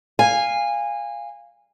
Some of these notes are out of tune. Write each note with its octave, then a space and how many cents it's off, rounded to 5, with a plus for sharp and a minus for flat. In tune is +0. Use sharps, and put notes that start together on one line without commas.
F5 +0 G#5 -20